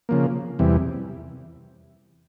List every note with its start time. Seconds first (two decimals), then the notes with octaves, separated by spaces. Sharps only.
0.09 C#3 F3 A#3
0.59 E2 C3 E3 G3